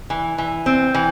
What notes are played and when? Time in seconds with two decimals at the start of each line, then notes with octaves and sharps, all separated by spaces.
0.10 E3
0.38 E3
0.66 C4
0.94 E3